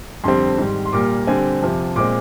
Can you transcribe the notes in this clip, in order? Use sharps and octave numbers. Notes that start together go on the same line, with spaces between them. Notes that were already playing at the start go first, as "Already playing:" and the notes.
F2 D3 G3 C4 C6
G#2 D#3 G3
C6
A#2 G3 A#3 D6
D3 G3 C4 G#5
F2 C3 F3
A#2 G#3 C4 D6